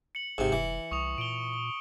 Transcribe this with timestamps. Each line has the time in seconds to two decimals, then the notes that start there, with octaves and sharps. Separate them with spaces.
0.15 C#7 F#7
0.38 G#1 G#2 C3
0.52 F1 E3
0.91 C2 C#6 D#6 F7
1.18 A#2 D7 G7